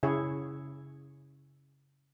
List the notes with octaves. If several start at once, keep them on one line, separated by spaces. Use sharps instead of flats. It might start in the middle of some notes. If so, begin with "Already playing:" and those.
C#3 E4 G#4 C#5